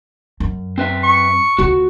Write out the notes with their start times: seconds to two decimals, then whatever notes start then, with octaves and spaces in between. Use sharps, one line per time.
0.40 F#2
0.78 C4 B4 E5
1.04 C#6
1.58 D2 F4 F#4